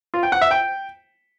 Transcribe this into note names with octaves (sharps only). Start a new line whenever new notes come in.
F4
G5
F#5
E5
G5